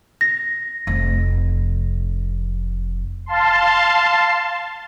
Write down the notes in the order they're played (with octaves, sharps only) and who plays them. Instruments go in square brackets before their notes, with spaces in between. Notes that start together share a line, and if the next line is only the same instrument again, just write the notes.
[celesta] A#6
[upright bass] F1 F2
[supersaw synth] F5 A5 C6